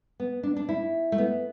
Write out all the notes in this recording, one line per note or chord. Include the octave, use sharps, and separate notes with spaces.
B3
D4
D4
E4
A3
B3